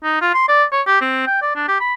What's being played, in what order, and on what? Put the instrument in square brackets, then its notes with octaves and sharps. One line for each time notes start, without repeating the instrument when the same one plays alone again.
[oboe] D#4
F4
C6
D5
C#5
G4
C4
G5
D5
D4
G4
B5